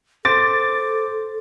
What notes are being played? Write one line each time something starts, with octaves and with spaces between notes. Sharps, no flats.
A4 C5 D6 A6